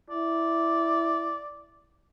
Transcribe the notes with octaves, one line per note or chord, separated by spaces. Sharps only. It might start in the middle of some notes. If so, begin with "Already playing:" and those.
E4 D5